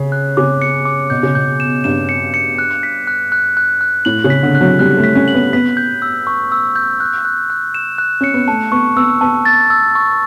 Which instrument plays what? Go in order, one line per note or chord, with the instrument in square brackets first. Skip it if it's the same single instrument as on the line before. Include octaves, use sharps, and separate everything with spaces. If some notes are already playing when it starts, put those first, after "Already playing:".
Already playing: [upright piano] C#3
[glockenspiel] F#6
[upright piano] C#3 [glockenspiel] D6
[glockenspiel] C#7
D6
[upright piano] B2 [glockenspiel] G6
[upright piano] C#3
[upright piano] B2 [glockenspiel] G6
[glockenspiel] E7
[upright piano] G2 [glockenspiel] E7
[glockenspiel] C#7
C#7
F#6
B6
F#6
F#6
F#6
F#6
[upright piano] A2 [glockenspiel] F#7
[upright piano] C#3
[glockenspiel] B6
[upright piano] D3
[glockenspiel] F#6
[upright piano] F#3
[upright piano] G3 [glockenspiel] F#6
[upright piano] A3
[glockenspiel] B6
[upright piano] C#4
[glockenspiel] F#7
[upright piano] B3
[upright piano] B3 [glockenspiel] B6
[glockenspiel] G6
E6
C#6
E6
G6
F#6
F#6
F#6
E7
F#6
[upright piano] C#4 [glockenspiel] C#7
[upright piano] B3
[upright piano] A3 [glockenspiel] A5
[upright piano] B3 [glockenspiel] C#6
[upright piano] B3 [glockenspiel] E6
[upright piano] B3 [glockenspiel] A5
[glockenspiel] A6
E6
C#6